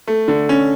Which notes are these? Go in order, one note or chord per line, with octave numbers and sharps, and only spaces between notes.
A3
D3
C#4